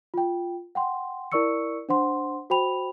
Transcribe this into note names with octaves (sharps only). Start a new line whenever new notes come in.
F4 G5
F#5 G5 C6
E4 A#4 D5 C#6 E6 C#7
D4 C5 F#5 C6
F#4 C5 G5 B5 F7